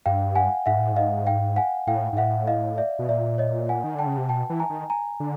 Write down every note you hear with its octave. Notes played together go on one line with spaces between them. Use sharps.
G2 F5 G5
F#5 G#5
G#2 E5 F#5
A2
G#2 D#5 F5
F5 G5
F#5 G#5
A2 F5 G5
G#2
A2 E5 F#5
D#5 F5
D5 E5
B2
A#2 D5 E5
C#5 D#5
F#5 G#5
D#3
D3 G5 A5
C#3
C3
B2 G5 A5
E3
G#5 A#5
D#3
G#5 A#5
D3